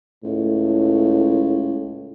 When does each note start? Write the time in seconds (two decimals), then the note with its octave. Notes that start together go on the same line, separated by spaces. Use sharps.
0.24 C#2 A2